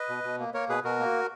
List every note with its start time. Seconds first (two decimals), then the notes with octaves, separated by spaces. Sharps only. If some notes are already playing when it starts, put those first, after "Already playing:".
Already playing: B4 D#5
0.09 B2
0.24 B2
0.39 A#3
0.54 A#3 A#4 C#5
0.69 B2 G#4 B4
0.84 B2 F#4 A#4
1.00 A#3